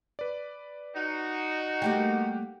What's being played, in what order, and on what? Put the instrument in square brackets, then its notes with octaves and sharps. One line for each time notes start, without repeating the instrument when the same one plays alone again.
[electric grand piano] B4 D5
[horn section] D#4 F#4
[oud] G3 A3 A#3 [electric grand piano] G4 F#5 G5